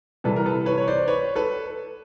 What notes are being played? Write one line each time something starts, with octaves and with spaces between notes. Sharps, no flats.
C3 E3 G3 A4 B4
A#4
A4 B4
B4 C#5
C#5
C5 D5
B4 C#5
A4 B4